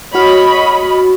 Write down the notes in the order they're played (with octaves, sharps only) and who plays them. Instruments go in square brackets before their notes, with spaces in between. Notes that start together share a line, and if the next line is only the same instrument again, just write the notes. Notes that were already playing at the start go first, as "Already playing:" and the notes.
[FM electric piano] F#4 F6 [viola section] C#5 D#5 B5